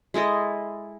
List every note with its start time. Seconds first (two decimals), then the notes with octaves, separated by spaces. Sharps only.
0.14 G#3 E4 A4 D#5